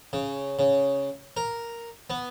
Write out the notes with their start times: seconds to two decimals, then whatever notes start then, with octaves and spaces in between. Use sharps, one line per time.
0.13 C#3
0.59 C#3
1.37 A#4
2.10 B3